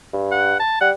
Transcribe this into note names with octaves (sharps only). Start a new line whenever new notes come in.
G2
F#5
A5
G3 F#5